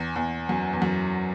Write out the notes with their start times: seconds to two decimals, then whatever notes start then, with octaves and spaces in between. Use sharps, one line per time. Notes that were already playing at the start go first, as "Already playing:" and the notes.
Already playing: E2
0.16 E2
0.49 F#2
0.73 E2
0.82 F#2